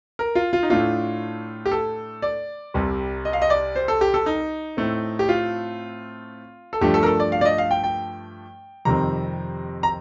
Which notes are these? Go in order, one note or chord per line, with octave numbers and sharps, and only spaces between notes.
A#4
F4
F4
D#4
A2 A3 D4 F4
G4
A4
D5
C2 C3 G3
D#5
F5
D#5
D5
C5
A4
G4
A4
D#4
A2 A3 C4
G4
F4
A4
G2 F3 A3 D4 G4
A4
A#4
A4
D5
F5
D5
D#5
F5
G5
G5
F2 C3 D#3 G3 C4 A#5
A#5